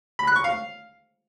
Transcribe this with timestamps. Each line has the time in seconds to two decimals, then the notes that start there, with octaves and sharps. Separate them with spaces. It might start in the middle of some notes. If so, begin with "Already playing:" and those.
0.19 B5
0.27 F#6
0.36 C#6
0.44 F5